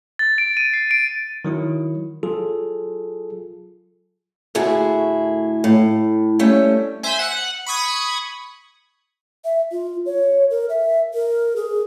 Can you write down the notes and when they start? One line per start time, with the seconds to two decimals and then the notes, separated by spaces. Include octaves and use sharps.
0.19 A6
0.38 D7
0.57 D#7
0.73 C7
0.91 D7
1.45 D#3 F#3 E4
2.23 F#3 F4 G#4 A4
4.55 D2 A2 E4 F#4 G#4
5.64 A2
6.39 G3 A3 C#4
7.03 C5 E5 G#5
7.19 F#5
7.66 B5 C#6 D#6 G#6
9.45 E5
9.72 F4
10.06 C#5
10.50 A#4
10.69 E5
11.14 A#4
11.56 G#4